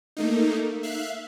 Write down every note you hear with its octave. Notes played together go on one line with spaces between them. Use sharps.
A3 A#3 D#4
E5 F5 F#6